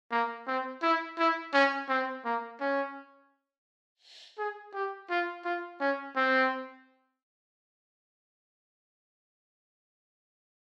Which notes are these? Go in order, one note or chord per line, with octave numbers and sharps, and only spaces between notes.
A#3
C4
E4
E4
C#4
C4
A#3
C#4
G#4
G4
F4
F4
C#4
C4